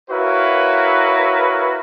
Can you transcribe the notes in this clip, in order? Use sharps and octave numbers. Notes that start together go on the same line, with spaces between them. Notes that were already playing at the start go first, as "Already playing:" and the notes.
E4 F#4 A#4 B4 C#5 F5